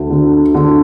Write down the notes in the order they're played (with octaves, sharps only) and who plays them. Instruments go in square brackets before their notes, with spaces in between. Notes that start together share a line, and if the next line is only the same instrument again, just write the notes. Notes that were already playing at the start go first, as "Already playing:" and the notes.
Already playing: [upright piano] D2
D3
D3